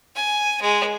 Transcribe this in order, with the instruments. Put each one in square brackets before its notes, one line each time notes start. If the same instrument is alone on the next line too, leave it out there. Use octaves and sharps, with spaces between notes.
[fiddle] G#5
G#3